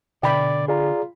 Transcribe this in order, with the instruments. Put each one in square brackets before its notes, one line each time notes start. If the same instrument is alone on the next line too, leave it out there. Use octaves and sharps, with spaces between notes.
[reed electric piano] B2 [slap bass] D3 [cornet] D5 [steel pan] G5 B5
[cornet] F4 [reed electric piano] G#4 D5 A#5